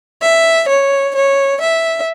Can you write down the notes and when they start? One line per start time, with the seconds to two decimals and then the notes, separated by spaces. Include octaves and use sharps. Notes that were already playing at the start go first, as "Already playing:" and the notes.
0.21 E5
0.68 C#5
1.15 C#5
1.60 E5